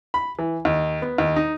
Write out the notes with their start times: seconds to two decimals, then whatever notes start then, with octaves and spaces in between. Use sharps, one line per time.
0.14 B5
0.39 E3
0.65 D#2
1.02 B3
1.18 D#2
1.36 D#4